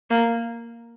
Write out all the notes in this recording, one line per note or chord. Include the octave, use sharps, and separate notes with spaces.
A#3